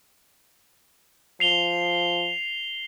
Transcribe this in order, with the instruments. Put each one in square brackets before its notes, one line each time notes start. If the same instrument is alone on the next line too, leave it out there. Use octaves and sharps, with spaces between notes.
[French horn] F3 [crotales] C7 F7 G7